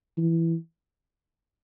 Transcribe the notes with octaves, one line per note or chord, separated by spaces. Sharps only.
E3